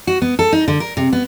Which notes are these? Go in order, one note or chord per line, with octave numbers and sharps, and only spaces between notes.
F#4
B3
A4
D#4
D3
A#4
C3
B3